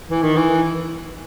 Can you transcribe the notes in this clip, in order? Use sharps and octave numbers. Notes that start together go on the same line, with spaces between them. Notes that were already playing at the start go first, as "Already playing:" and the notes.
E3
D#3
E3